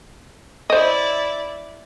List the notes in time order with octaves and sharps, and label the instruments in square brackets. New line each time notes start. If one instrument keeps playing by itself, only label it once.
[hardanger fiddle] E4 D5 [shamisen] C5 D#5